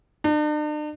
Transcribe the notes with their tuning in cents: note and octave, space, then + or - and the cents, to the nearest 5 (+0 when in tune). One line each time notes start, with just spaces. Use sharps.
D4 +45